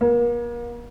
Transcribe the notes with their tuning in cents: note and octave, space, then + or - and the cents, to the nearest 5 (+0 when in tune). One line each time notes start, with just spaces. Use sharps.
A#3 +40